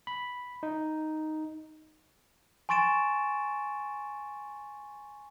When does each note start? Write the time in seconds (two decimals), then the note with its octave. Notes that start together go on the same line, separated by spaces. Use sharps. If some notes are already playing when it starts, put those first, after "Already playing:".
0.07 B5
0.63 D#4
2.69 G#5 C6 C#6 A6 D7 E7